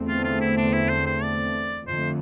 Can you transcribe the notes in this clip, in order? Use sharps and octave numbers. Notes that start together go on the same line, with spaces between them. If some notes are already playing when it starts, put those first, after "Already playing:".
Already playing: E2 D3 A3 C4
F4
F4
E4
D4
E4
C5
C5
D5
F2 D3 A3 C5